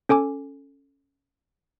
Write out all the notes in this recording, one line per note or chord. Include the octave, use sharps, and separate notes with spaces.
C#4 A4 G#5 D6